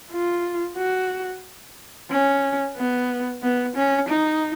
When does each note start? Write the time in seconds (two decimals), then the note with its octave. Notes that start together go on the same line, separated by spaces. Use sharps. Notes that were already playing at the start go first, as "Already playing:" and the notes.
0.11 F4
0.77 F#4
2.10 C#4
2.76 B3
3.43 B3
3.76 C#4
4.08 D#4